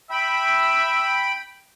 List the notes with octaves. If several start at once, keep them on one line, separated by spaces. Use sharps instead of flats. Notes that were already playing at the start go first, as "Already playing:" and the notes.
E5 G5 B5